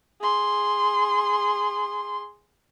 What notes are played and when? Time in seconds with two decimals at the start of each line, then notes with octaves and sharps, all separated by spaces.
0.21 G#4 C6